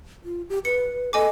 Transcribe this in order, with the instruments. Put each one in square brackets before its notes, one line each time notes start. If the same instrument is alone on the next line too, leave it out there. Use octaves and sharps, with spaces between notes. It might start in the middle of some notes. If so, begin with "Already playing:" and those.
[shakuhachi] F4
G4
[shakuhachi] B4 [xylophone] C#7
[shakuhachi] A4 [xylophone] D#5 G#5 D6